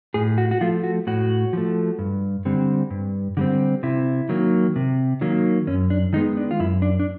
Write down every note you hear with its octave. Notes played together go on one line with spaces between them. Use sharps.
A2 G#4
F#4
F#4
F3 A3 F4
F#4
A2 F#4
F3 A3
G2
D3 G3 C4
G2
D3 G3 C4
C3 E4
D#3 F#3 A#3
C3
D#3 F#3 A#3
F#2 C#4
D4
D#3 G#3 B3 D#4
D4
F4
F#2 E4
D4
D4